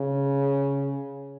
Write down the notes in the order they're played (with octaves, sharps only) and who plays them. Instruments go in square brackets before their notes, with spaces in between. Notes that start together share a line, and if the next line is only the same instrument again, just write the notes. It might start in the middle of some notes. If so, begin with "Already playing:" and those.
Already playing: [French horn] C#3